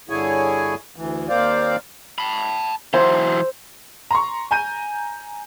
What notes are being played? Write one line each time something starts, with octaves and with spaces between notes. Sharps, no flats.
G2 D3 E4 G#4 C#5 G#5
D2 E3
D#2 A#3 C4 C5 D5 F5
A5 B5
E3 F#3 C5 E6
A#5 C6 C#6
G#5 A#5 G6 D#7